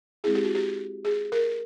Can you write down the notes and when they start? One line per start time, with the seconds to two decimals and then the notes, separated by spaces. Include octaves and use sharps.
0.24 G#3 C4 E4 G#4
0.35 G4
0.45 F#4
0.55 G4
1.05 G#4
1.32 A#4